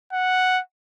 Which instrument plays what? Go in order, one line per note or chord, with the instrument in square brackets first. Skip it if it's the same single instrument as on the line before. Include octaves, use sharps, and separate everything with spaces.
[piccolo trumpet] F#5